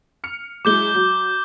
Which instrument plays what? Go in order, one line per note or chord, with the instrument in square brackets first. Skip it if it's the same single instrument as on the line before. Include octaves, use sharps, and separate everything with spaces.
[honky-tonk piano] F6 C#7
[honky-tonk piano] F#3 G#3 E4 [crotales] D6 G6 G7
[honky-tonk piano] F#3